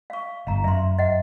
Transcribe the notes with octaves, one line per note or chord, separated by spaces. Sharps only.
F5 C#6
G1 G2 F5 A#5
F#2 E5 C6
D#5 E5 F#5